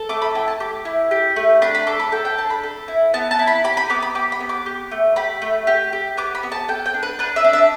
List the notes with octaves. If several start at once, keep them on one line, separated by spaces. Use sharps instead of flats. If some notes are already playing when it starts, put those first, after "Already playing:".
Already playing: A4
A3 D6
B5
E4 G5
A5
G4 D6
E4
G4
A3
D4 B5
B5
A4 D6
B5
A4 G5
G5
D4 A5
B5
A4
E4
B3 A5
A5
E4
B5
G4 B5
B5
B3 D6
B5
G4 D6
B5
B3
D6
G4
A3
G4 B5
A3
G4
G4
B3 D6
B5
B3
A5
A4 G5
G5
D4
B4
D4 B4
E5
D4
E5